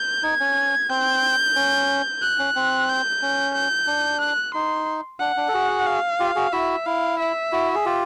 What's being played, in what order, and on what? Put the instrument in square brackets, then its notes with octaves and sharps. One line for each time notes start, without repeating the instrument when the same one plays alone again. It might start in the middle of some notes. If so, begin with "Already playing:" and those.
Already playing: [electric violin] G6
[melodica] D#4 [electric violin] G#6
[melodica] C#4
[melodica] C4 [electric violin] G6
[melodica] C#4
[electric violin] F#6
[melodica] C#4
C4
[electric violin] G6
[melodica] C#4
[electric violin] G6
[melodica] D4
[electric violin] F#6
[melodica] D#4 [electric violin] C6
[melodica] D4 [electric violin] F#5
[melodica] D4
A4
F#4 G#4
[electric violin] F5
[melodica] F4 G4
F#4 G#4
[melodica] E4 F#4 [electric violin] E5
[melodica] E4 [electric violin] F5
[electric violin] E5
[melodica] E4 F#4
G#4
F4 G4